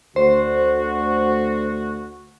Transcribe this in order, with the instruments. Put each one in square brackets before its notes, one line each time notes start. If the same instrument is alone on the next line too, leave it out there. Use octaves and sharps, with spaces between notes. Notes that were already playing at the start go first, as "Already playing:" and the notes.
[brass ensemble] D2 F#4 [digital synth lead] C5